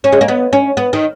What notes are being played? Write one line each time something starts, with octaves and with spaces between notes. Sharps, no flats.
C#4
G#3
A#3
B3
C#4
B3
D#3